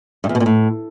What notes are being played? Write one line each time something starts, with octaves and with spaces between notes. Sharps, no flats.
G2
E2
B2
A#2
A2